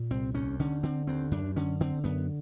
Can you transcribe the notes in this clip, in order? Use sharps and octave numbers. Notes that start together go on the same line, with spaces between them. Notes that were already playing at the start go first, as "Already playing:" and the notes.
Already playing: A#2
C2 C4
D#2 C#4
D3 C#4
D3 C4
D#2 C4
F#2 D4
D3 C#4
D3 C4
F#2 B3